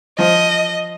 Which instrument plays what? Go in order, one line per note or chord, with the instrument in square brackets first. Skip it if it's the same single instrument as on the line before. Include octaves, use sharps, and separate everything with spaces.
[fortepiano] F3 [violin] D#5